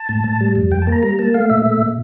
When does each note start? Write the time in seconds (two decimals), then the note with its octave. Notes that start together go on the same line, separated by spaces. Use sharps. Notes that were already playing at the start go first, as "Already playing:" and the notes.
Already playing: A5
0.09 A2
0.24 A2
0.41 G3
0.55 F2
0.71 F2 G5
0.82 A5
0.87 A#3
0.92 A#5
1.03 G3 A#5
1.19 A#3 A5
1.34 A3 F5
1.50 A#2 E5
1.66 A3
1.82 A#2